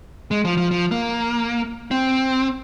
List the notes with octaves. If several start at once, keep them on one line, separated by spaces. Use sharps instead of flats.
G#3
F3
F3
F3
A#3
C4